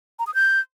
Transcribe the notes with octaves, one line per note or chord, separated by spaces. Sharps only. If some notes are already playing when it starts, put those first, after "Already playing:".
A#5
D#6
G6